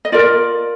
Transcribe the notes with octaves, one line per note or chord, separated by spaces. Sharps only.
D#5
F4 A#4 D5